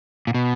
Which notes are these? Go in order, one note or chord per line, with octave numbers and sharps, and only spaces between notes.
A#2
B2